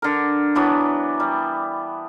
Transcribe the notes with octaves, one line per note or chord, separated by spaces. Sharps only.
D3 A#4
E3 F#3 B3 D4
G3